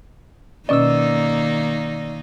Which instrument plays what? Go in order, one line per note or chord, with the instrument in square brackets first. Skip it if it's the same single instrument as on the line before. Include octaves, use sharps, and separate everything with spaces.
[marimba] B2 C#4 D#5 [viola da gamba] D#3 A#3 D#4 [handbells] D5 E6